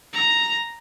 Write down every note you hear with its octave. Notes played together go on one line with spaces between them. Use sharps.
A#5